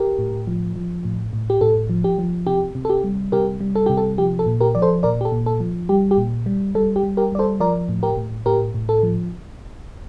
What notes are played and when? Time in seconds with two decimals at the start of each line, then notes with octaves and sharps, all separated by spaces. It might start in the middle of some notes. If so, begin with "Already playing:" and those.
Already playing: G4 A#4
0.19 A2
0.47 F3
0.76 F3
1.04 A2
1.33 A2
1.50 G4
1.61 A2 A4
1.90 F3
2.04 G4
2.18 F3
2.47 C3 G4
2.75 C3
2.85 A4
2.89 G4
3.04 G3
3.32 C3 G4 A#4
3.61 G3
3.75 A4
3.86 C3 G4
3.97 A4
4.18 F3 G4
4.39 A4
4.46 A#2
4.60 G4 A#4
4.75 F3 D5
4.82 A4 C5
5.03 A#2 A#4 D5
5.21 G4
5.25 A4
5.32 A#2
5.46 A4
5.60 F3
5.89 G3 G4
6.11 G4
6.18 A#2
6.46 G3
6.75 G3 A4
6.96 G4
7.03 G3
7.17 G4 A#4
7.32 G3 D5
7.39 A4 C5
7.60 F3 A#4 D5
7.89 A2
8.03 G4 A#4
8.17 A2
8.46 A2 G4 A#4
8.75 A2
8.89 A4
9.03 F3